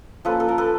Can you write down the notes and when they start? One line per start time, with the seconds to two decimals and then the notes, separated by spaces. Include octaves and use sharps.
0.25 F3 A#3 C#4 A4 B4
0.40 A4
0.49 A#4
0.58 A4 B4